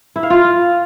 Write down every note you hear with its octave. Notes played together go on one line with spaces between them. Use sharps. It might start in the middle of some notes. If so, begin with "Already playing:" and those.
E4
F5
F4